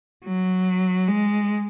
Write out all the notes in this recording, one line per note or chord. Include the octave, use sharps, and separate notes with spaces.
F#3
G#3